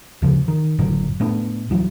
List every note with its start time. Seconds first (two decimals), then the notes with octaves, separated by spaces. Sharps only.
0.22 D2 C#3 F3
0.48 D#3
0.79 F#1 A2 D3 F#3
1.20 A2 A3 B3 D4
1.70 D1 E3 F#3